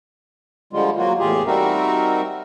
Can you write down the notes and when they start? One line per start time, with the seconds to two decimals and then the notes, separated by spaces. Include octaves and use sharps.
0.73 D3 F3 G3 G#3 F4
0.97 F#3 A#3 F4 F#4
1.19 E2 A2 F4 G4 G#4
1.47 G3 C4 D#4 F#4 A#4 E5